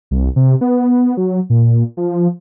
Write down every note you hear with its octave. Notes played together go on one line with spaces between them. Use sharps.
C2
C3
B3
F#3
A#2
F3